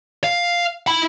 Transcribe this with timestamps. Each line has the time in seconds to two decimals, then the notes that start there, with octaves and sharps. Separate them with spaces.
0.24 F5
0.87 E4 B5